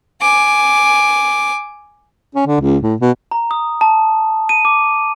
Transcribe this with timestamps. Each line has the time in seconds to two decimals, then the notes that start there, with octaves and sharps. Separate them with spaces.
0.21 G#5 D6
2.35 C#4
2.46 D3
2.60 C#2
2.82 A2
3.01 B2
3.31 A#5
3.51 D#6
3.81 A5
4.49 D#7
4.65 D6